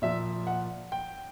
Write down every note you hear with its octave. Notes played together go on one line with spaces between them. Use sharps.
A#2 F3 E5
F#5
G5